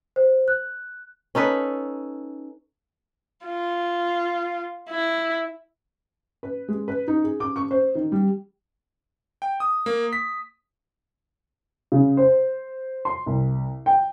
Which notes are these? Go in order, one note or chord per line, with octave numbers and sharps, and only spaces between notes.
C5
F#6
C#4 D#4 A4 B4
F4
E4
B4
G#3
B4
D#4
G#4
D6
C#6
C5
D#3
G3
G5
D#6
A#3
B6
C#3
C5
C6
C2
G5